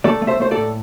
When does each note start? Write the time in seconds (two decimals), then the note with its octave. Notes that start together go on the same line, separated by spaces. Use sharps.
0.04 A3 A4 D5
0.22 A3
0.27 C5 E5
0.40 A3 C5
0.51 A4 D5
0.57 A2